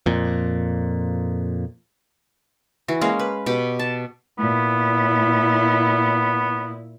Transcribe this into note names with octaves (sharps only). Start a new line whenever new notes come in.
F2 A#2
E3 F#4
G#3 A#3 C#4 F5
B4
B2 G4 D6
A5
A#2 B3 E4